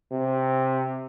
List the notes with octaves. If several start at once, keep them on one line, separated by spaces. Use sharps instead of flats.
C3